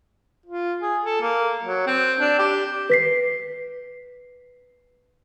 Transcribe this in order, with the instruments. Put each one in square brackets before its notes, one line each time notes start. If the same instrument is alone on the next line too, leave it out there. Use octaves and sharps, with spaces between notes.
[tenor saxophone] F4
G#4
A4
A#3
F#3
C4
D4
G4
[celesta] B4 B6 C7